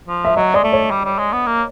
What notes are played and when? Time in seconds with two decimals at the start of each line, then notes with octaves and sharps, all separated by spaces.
0.08 F3
0.25 E5
0.36 F#3 D#5
0.54 G#3 D5
0.64 A3
0.73 C#5
0.91 G3
1.05 G3
1.19 G#3
1.33 B3
1.47 A#3